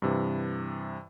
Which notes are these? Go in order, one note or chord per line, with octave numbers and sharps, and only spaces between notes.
G2 C3 E3